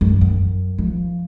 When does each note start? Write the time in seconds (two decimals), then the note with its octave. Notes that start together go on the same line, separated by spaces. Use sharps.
0.01 F#2
0.21 F#2
0.78 F3